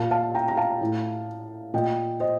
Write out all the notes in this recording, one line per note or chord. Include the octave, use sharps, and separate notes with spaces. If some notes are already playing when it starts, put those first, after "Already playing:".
Already playing: A#2 F5 A5
F5 A5
G5 A#5
A#5
F5 A5
A2
A#2 D#5 G5
C5 D#5